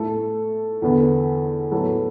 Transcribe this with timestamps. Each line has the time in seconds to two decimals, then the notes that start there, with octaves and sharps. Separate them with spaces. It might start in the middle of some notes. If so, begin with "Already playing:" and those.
Already playing: A2 A3 A4
0.82 E2 D3 B3
1.72 A2 F#3 B3 A4